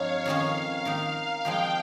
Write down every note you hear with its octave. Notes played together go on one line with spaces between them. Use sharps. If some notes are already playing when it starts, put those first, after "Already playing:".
Already playing: G2 F3 G#3 C4 D#4 C#5 F5
F2 D#3 A#3 C#4
D#3 A#3 D#4 F5
F3 G#3 C4 G4 G5